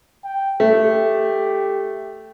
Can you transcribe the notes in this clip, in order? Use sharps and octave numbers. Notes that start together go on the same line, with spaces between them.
G5
A3 G4